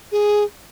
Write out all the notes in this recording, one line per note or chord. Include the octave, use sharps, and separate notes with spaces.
G#4